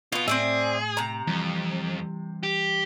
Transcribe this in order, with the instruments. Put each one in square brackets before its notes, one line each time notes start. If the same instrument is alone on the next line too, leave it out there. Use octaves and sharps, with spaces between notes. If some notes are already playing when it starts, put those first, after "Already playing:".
[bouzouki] B2 B3 [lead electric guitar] F4
[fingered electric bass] A2 [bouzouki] C4 D5 E5 [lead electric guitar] G#4
[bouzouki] C3 A#5
[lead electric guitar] F2 [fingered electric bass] E3 G3
[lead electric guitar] G4